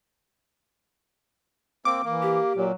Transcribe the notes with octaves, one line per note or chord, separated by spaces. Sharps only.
A#3 C4 D6
E3 A#3
G4
A#2 F#3